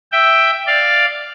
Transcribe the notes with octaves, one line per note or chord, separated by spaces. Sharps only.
E5 G5
D5 F5